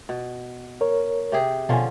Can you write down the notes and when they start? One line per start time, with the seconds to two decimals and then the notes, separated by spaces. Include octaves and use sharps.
0.09 B2
0.81 A#4 C#5
1.32 C3 G4 G#4
1.69 B2 D3 F3 C#4 G#5